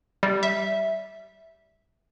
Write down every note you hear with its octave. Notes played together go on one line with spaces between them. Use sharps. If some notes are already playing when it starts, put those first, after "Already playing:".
G3
E5